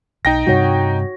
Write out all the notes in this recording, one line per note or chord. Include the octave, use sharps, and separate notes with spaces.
B1 D#4 G5 A#6
G2 C3 G3 F#4 C#5